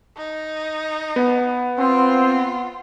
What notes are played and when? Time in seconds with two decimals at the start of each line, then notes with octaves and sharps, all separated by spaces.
0.17 D#4
1.16 B3 F#5
1.79 C4 F4